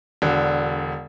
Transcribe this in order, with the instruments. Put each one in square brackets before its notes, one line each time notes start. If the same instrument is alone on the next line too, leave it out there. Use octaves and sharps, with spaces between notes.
[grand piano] E1 D3